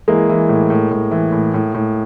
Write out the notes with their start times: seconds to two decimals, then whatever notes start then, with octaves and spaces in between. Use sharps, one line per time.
0.08 E3 G#3 A#3
0.29 E3
0.49 A2
0.70 A2
0.91 A2
1.11 E3
1.32 A2
1.54 A2
1.74 A2